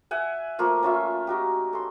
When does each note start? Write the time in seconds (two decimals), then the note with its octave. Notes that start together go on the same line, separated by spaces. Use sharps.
0.11 E5 F#5 G#5
0.59 F3 A3 A#3 F4
0.83 C#4 F4 E5
1.27 D#4 F#4 G4
1.73 A4 C6